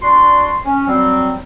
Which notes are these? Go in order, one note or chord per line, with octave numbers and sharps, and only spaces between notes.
D4 F#4 D5 C6
C#4
F#3 G3 C4